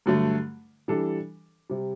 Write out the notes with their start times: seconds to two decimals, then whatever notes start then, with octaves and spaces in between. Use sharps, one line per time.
0.06 G2 D3 F#3 A3
0.88 E3 G3 D4 A4
1.70 C3 G3